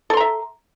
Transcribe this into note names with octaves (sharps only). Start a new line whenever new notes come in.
A4 E5 A#5 C6